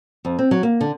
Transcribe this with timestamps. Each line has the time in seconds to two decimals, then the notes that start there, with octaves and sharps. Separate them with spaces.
0.25 F2
0.39 C4
0.51 F#3
0.63 A#3
0.81 D3